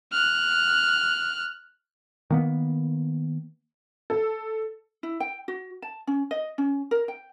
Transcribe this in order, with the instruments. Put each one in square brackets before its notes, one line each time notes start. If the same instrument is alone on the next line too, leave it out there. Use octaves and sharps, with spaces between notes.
[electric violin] F6 F#6
[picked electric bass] D#3 A#3 B3
[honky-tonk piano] A4
[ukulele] E4
G5
F#4
A5
C#4
D#5
C#4
A#4
G5